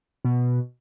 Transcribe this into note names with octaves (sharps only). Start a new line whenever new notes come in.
B2